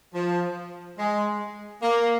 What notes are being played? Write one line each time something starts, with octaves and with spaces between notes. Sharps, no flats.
F3
G#3
A#3